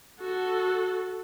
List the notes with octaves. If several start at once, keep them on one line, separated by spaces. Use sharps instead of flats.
F#4 A4